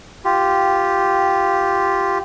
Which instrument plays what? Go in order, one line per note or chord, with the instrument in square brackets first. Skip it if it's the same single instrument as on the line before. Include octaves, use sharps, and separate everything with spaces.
[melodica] F4 G4